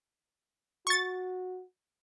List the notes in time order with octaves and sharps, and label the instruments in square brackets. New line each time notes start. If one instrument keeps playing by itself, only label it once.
[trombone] F#4 [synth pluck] C#6 A6